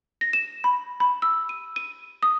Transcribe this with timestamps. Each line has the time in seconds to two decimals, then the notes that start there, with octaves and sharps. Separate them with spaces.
0.21 A#6
0.33 E7
0.64 B5
1.00 B5
1.22 E6
1.49 D#7
1.76 D#7
2.23 D#6